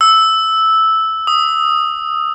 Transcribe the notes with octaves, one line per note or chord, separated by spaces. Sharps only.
E6
D#6